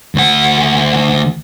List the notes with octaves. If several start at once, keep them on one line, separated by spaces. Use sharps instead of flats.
D2 F#5